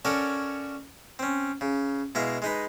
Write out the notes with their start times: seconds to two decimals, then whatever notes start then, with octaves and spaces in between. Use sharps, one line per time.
0.05 C#4 F#4 A4 A#4 C#5 D5
1.19 C4 C#4
1.61 C#3
2.15 B2 G#3 E4 F5 A#5
2.42 G#3 D#4 B4